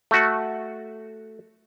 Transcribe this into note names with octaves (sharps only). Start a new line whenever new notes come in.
A3 F#4